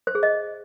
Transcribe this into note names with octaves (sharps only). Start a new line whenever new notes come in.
C5
G#4
D#5